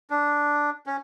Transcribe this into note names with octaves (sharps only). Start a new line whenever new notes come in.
D4
C#4